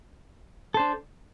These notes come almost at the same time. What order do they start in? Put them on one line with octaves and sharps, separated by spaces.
A4 C5 D4